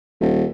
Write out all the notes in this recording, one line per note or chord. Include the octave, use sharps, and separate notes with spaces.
D#1